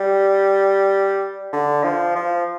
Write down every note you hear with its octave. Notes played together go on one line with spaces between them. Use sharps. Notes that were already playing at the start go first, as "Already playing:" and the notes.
Already playing: G3
D3
F3
F3